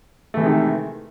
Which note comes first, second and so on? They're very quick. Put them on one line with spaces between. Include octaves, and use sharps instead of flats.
A3 E3 C3 G#3 D#3